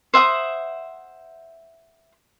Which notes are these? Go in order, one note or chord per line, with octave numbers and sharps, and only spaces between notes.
C5 E5 F#5 D#6